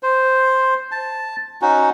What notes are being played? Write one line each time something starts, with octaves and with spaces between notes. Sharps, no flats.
C5
A5
C#4 D#4 F#4